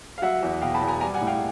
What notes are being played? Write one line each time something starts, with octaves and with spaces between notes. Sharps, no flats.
F5
F#3 E5 F#5
E2
B2 F5 G5
A5 B5
E2
G#5 A#5
G3 G#5 A#5
F#5 G#5
A2
F5 G5